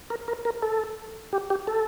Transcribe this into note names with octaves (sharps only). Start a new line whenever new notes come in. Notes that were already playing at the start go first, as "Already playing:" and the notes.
A#4
A#4
A#4
A4
G4
G4
A4